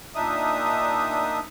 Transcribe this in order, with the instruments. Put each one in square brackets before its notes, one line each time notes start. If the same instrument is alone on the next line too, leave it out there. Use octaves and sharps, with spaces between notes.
[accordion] A#2 D4 D#4 E5 D#6